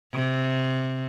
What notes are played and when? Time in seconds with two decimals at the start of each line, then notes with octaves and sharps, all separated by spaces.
0.14 C3